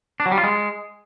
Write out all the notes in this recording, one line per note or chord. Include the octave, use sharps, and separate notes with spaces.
D4
F#3
G3
F4
G#3